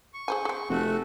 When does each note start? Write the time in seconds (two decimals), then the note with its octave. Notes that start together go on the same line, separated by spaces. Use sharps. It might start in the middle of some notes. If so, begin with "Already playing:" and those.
0.14 C#6
0.28 G#4 C5 G#5
0.45 C4 G#4
0.70 F1 A3 F#4